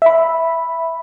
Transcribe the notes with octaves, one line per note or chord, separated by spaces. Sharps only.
E5 B5